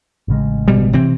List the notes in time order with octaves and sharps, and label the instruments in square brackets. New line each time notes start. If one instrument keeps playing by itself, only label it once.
[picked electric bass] A1 C#3 G#3
[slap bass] B2 G3
C3 E3 C4